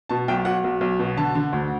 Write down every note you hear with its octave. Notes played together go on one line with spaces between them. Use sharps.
B2 A5
B1 G5
B1 F#5
B1
B1
B2
D3 A5
D3
D2